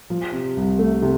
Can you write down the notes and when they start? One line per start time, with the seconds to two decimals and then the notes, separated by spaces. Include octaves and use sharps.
0.10 F3
0.32 C3
0.56 C2
0.79 A3
1.02 C3